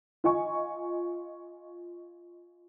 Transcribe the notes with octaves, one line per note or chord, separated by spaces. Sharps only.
F4 D#5 G#5 C#6